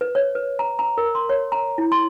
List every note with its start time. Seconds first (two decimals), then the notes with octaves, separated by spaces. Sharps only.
0.01 B4
0.15 C#5
0.35 B4
0.59 A#5
0.79 A#5
0.98 A#4
1.15 C6
1.29 C#5
1.52 A#5
1.78 E4
1.92 C6